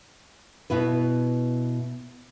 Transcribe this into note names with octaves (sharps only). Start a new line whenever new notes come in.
B2 B3 E4 B4